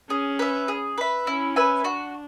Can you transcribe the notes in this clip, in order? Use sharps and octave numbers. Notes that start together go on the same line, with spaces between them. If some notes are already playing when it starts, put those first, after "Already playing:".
C#4 G#4
B4 E5
G#4
B4 E5
C#4 E4
B4 E5 G#5
D4 F#4